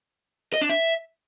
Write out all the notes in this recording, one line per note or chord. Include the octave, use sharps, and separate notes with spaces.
D#5
D4
E5